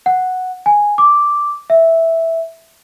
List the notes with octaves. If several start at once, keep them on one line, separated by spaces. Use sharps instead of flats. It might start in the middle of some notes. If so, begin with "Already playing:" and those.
F#5
G#5
D6
E5